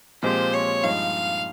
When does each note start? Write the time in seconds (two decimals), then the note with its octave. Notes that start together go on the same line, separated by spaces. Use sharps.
0.23 A#2 F3 G#3 C4 G4 C5
0.53 C#5
0.83 G2 F3 G#3 D#4 F5